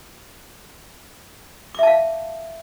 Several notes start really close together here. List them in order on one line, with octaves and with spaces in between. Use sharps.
D6 E5 A5 F5